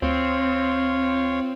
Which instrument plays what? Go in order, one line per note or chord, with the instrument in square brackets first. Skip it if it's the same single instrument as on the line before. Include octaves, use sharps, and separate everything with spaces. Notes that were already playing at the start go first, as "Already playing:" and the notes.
[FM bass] D2 [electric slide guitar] C4 [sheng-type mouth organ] F4 C#5